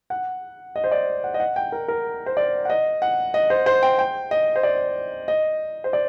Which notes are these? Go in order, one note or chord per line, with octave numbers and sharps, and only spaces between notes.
F#5
D#5
C5
D5
F#5
D#5
F#5
G5
A#4
A#4
C5
D5
F#5
D#5
F#5
D#5
C5
C5
G5
G5
D#5
C5
D5
D#5
C5
D5